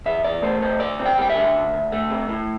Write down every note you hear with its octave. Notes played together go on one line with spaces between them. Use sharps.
E2 E5
E2 D5
A3 C5
C3 C5
D2 D5
C4
G5
G3 G5
E5
D3
D2
D2
A3
C3
A2